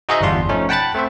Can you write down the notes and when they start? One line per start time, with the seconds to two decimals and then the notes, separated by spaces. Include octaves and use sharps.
0.09 D#4 F#4 G#4 C5 D#5 E5
0.21 G1 E2 G3 D4 F4 C6
0.49 F3 A3 C#4 D#4
0.69 F#5 G5 A5 B5 F#6 A6
0.94 A3 C4 C5 E5